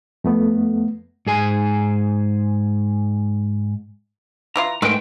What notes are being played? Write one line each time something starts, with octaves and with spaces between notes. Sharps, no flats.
F2 A3 B3
G#2 G#4 G#5
E3 E4 F4 A#5
G#2 A3 A#4 B4 D#5 G5